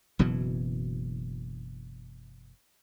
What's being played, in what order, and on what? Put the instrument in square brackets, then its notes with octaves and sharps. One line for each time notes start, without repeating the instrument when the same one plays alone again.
[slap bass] F#1 B2 E3 F#3